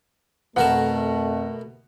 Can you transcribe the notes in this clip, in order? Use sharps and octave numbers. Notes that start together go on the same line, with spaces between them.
F2 B2 A3 A#4 F#5 A5